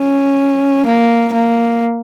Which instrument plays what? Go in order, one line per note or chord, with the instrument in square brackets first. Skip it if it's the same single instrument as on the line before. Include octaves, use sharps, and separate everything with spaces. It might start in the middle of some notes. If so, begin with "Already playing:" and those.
Already playing: [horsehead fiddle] C#4
A#3
A#3